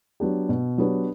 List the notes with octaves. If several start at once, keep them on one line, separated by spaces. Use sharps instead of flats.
F#3 B3 D4 G4
B2
F#3 B3 D4 G4